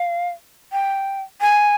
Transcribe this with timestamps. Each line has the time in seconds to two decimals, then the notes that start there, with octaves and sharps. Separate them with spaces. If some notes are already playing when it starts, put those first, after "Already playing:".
Already playing: F5
0.72 G5
1.41 G#5